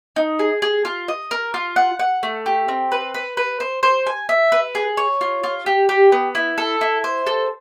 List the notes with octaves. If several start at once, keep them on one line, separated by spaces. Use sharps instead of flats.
D#4
G#4
G#4
F4
D#5
A#4
F4
F#5
F#5
A3
G4
C4
B4
B4
B4
C5
C5
G#5
E5
B4
G#4
C#5
F4
F4
G4
G4
B3
E4
A4
E4
C5
A4